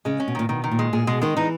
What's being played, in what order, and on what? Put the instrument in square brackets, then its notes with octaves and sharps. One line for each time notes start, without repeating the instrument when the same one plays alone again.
[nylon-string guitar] C#3 [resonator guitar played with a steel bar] G#3
[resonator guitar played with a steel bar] C#4
[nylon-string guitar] B2
[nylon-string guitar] A#2 [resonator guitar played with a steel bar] D#3
[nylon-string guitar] B2 [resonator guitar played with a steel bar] D#3
[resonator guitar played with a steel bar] D#3
[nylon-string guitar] A#2
[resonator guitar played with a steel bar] G#3
[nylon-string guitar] A#2 [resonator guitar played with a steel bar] G#4
[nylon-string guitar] B2 [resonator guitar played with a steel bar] G#3
[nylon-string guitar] D#3 [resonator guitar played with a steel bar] G#3
[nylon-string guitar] E3 [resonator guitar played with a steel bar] D#4